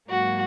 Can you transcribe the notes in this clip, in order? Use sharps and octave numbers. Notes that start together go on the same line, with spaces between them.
G#2 F#3 A#3 F#4